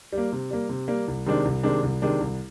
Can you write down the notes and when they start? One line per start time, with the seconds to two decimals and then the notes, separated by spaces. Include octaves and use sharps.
0.12 G3
0.18 A#3
0.32 C3
0.51 G3 A#3
0.69 C3
0.88 G3 A#3
1.08 C2
1.26 C3 D#3 G#3 D4
1.45 C2
1.63 C3 D#3 G#3 D4
1.83 C2
2.02 C3 D#3 G#3 D4
2.21 C2